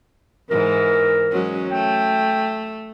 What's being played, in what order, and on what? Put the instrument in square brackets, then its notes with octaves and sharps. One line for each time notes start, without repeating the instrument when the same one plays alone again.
[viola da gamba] G#2 E3 [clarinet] A#4
[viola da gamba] F#3 G#3 C#4
[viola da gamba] A3 [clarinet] G5